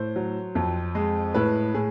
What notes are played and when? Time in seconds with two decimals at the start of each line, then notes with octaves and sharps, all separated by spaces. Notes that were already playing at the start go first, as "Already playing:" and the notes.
Already playing: A2 C5
0.16 F#3
0.55 F2
0.95 G#3
1.34 A2 B4
1.74 A2 G#4